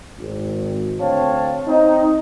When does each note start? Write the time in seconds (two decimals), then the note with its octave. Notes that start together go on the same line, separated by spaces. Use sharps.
0.20 G#1
0.99 D2 C4 C#5 F5 A5
1.67 C4 D#4